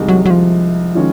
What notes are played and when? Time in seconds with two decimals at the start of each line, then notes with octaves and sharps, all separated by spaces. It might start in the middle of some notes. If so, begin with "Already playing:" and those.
Already playing: C2 C3 D#3 G#3 D#4
0.08 F#3
0.26 F#3
0.30 F3
0.95 D#3 G#3 C#4 F4